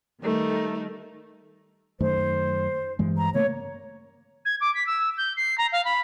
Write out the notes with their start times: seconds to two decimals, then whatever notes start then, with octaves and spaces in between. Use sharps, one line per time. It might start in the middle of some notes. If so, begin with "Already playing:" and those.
0.21 D#3 G3 A3 D#4 A#4
2.01 F#2 D#3 A3 C5
2.99 G2 E3 G#3
3.17 A#5
3.34 C#3 A3 A#3 C#5
4.45 G#6
4.61 D6
4.74 B6
4.87 E6
5.17 G6
5.37 C7
5.58 A#5
5.72 F5
5.85 B5